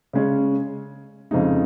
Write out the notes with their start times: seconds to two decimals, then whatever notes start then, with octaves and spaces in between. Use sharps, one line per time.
0.13 C#3 G#3 C#4
1.31 F2 C#3 G#3 D#4